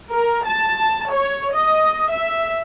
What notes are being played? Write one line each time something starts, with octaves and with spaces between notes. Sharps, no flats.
A#4
A5
C#5
D#5
E5